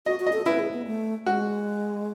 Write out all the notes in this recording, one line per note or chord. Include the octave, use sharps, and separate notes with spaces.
F#4 D#5
F#4
D#5
A4
E4 B4
G#4
B3
A3
G#3 F#4